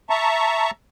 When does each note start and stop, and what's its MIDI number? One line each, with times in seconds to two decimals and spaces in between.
0.10 0.71 76
0.10 0.71 81
0.10 0.71 82
0.10 0.71 85